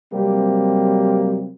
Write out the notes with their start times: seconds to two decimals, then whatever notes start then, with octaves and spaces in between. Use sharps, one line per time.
0.12 C3 F#3 G3 A#3 C4 G4